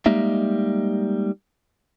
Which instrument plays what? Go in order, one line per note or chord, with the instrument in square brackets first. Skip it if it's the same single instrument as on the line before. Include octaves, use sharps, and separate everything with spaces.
[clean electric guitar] G3 G#3 A#3 D#4 E5